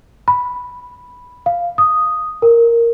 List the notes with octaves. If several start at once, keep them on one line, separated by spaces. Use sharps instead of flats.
B5
F5
D#6
A#4